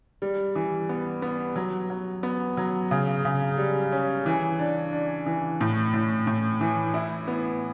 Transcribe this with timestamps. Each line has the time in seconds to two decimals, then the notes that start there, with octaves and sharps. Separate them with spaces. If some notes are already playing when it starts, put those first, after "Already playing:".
0.22 G3
0.55 E3
0.89 B3
1.22 B3
1.56 F#3
1.90 F#3
2.23 B3
2.57 F#3
2.91 C#3
3.25 C#3
3.58 G3
3.92 C#4
4.26 E3
4.59 D4
4.93 D4
5.26 E3
5.61 A2
5.94 A2
6.27 A2
6.61 E3
6.94 E4
7.28 B3